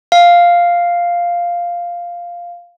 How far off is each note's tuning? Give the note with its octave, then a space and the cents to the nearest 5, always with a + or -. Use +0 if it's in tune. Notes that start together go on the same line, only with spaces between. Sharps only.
F5 +0